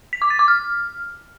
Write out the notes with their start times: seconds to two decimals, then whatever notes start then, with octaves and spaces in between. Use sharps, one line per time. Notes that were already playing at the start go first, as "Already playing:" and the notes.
0.13 B6
0.22 D6
0.30 A6
0.39 D6
0.48 F6